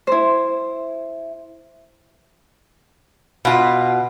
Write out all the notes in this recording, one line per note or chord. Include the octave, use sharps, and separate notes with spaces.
E4 C5
B2 F4